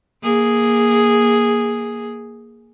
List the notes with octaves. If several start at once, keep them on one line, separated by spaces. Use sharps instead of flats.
A#3 G#4